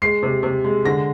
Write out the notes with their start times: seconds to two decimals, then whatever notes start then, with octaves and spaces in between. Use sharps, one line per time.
0.02 G#3 C7
0.23 C3
0.43 C3
0.64 G#3
0.85 D3 A#6